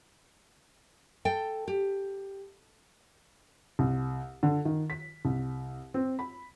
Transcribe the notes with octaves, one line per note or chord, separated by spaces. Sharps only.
A4 G5
G4
C2
D3
D#3
B6
C2
C4
B5